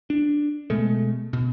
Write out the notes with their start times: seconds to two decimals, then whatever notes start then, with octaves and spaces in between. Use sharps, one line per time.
0.10 D4
0.70 B2 G#3 A3
1.33 B2